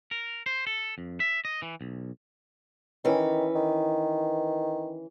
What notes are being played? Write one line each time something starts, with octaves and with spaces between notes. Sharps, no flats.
A#4
C5
A4
F2
E5
D#5
E3
B1
D#3 E3 C#4 B4
D#3